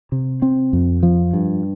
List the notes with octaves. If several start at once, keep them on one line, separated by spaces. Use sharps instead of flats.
C3
C4
F2
F3
G2